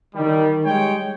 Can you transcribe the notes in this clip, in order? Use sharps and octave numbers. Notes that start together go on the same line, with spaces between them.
D#3 G3
G3 G#3 C#5 G5